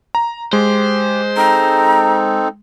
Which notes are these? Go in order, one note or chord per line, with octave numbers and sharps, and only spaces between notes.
A#5
G#3 G4 C5
C4 D#4 A4 A#5